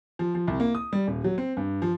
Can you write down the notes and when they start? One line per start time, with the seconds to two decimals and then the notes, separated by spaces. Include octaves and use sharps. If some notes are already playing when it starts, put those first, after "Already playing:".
0.19 F3
0.35 F3
0.48 C2
0.60 A#3
0.75 D#6
0.93 G3
1.07 D#1
1.24 F#3
1.38 C4
1.57 G2
1.82 F3